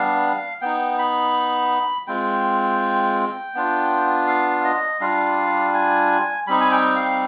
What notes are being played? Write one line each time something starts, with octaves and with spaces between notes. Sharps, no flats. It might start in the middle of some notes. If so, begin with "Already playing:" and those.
Already playing: G3 B3 D4 F5
B3 D#4 G5
B5
G#3 C4 F4 G5
B3 D4 F4
F5
D#5
G3 D4 F4 F5
G#5
G3 C4 D#4 B5
G#5
G5
F5